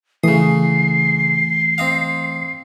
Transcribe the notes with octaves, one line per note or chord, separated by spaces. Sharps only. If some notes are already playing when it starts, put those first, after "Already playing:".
C#3 E3 A3 D#6 C7
C4 D#5 F5